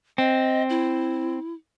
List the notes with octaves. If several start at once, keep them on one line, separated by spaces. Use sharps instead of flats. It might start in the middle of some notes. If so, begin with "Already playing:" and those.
C4 D#5
E4